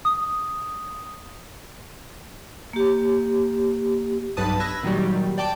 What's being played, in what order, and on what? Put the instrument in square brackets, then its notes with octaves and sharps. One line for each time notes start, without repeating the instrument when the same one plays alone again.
[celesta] D#6
[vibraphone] A#3 G4
[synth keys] B1 G2 B4 A5 D#6
B5 E6 F#6 G#6 A#6
A#2 D#3 F#3 G3
D5 G5 A5 D6